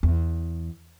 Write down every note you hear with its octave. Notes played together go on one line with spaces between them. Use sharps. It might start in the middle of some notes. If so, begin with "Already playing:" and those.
E2